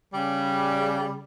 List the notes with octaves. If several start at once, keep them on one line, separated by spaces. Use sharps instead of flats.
C#3 G3